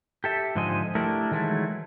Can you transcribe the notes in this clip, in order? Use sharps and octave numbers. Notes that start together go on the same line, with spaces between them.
G4 A4 E5
G#2 D3 F3 C5 D#5 G#5
A3 D4 E4 G4 A#4
D#3 E3 F#3 G#3 A3 E4